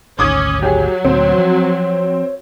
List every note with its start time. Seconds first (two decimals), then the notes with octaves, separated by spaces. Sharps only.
0.19 G#1 D2 C#4 D6 D#6 G#6
0.63 F#3 G4 G#4 C#5
1.05 D2 A#2 C4
1.38 F3